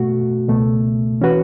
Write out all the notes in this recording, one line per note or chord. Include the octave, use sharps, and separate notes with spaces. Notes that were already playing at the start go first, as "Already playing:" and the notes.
Already playing: B2 A3 F#4
C#2 B2 A3
E3 C#4 F#4 B4